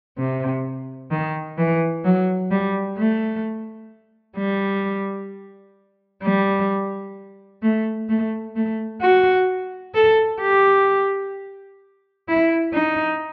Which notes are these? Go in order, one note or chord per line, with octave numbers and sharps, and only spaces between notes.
C3
D#3
E3
F#3
G3
A3
G3
G3
A3
A3
A3
F#4
A4
G4
E4
D#4